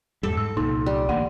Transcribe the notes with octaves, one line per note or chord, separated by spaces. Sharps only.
E2 G#2 G3 A4
G#2 E6
C2 A#2 D#4
G3
A1 D2 A#3 F#5